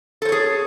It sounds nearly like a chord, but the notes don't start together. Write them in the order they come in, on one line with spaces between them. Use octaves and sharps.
A4 C5 C#5 G#4